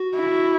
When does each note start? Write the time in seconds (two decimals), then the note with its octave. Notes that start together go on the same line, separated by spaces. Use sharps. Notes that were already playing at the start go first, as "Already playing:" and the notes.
Already playing: F#4
0.16 E4